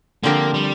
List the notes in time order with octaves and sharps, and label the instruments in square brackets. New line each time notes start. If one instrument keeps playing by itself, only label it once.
[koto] D3 F3 C4 G4 A#4 [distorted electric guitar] A#3
[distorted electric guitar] G3